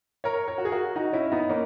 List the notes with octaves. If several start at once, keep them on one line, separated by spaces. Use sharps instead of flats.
A#4 C#5
A#4 C#5
F#4
G#4
F#4 A#4
D#4 F#4
C#4 E4
B3 D#4
A#3 C#4